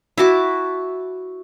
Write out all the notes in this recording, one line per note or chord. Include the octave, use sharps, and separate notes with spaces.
E4 F#4 A5 D6